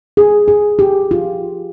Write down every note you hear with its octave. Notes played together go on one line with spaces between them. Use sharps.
G#4
G#4
G4
F4